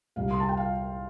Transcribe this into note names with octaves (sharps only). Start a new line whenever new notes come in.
C2 C3 G3 F5
C6
A5
G5
F5